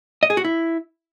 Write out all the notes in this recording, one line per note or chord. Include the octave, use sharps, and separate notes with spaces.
D#5
G#4
F#4
E4